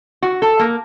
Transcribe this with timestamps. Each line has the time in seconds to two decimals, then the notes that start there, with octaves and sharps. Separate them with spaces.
0.22 F#4
0.42 A4
0.59 A#3